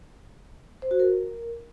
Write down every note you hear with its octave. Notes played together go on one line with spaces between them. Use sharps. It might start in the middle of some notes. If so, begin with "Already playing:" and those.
C5
F#4
A#4